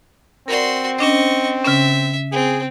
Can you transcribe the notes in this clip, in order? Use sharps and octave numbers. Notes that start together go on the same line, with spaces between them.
C4 F#4 A#4 D5 C6
C#4 D4 C5 D#5 C#6
C#3 C#4 E5
C4 G#4